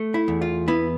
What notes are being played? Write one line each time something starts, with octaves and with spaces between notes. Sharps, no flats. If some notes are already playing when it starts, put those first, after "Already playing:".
Already playing: A3
E4
E2
F4
B3 E4